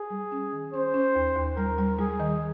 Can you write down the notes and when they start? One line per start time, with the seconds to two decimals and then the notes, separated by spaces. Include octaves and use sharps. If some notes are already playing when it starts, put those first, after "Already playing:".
Already playing: G#4
0.10 G3
0.32 C#4
0.52 D#3
0.73 C#4 C5
0.94 C#4
1.16 D#2
1.37 D#2
1.57 G3 A#4
1.78 G3
1.99 G3 G#4
2.20 D#3